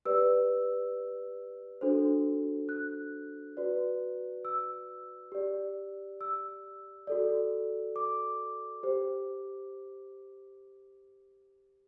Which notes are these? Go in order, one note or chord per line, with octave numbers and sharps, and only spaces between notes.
G4 B4 D5 E6
D4 F#4 A4 C5
F#6
F#4 B4 D5
E6
G4 D5
E6
F#4 A4 D5
D6
G4 C5